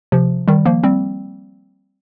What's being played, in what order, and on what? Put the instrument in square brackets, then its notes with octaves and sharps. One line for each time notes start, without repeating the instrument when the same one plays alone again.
[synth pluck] C3 F3
D#3 G3
F3 A#3
G3 C4